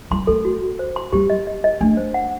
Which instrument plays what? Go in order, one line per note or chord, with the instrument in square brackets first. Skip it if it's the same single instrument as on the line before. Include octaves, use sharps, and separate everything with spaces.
[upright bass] G3 [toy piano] C6
[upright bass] A3 [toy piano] A4
[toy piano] F#4
F#4
C5
C6
[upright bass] G3 [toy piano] G4
[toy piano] D#5
D#5
D#5
[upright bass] A3 [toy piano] D4
[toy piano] C5
F#5